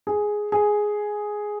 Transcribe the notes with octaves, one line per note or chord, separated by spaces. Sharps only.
G#4
G#4